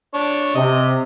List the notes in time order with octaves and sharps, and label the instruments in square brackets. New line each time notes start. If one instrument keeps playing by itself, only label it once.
[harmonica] D4 C#5
[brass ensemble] C3 [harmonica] D#5